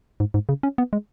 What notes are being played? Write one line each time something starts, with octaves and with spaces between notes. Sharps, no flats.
G#2
G#2
C#3
C#4
B3
G#3